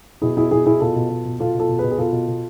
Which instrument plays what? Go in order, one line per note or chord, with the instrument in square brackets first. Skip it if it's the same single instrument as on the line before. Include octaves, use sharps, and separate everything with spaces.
[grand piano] B2 E4 G#4
B2 E4 G#4
B2 E4 G#4
B2 E4 G#4
B2 F4 A4
B2
B2
B2
B2 F4 A4
B2
F4 A4
B2
G#4 B4
B2
G#4
B2 F4 A4
B2
B2